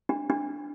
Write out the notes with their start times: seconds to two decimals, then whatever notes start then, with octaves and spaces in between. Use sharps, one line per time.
0.09 D4
0.30 D4